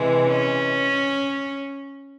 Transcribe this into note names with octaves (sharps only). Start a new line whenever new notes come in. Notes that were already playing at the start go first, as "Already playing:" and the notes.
Already playing: C3 E3 G#3
C#4